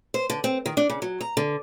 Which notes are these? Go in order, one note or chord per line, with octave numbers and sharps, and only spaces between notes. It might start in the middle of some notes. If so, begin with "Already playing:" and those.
C5
D3
C4
D#3
D4
C#3
F#3
A#5
D3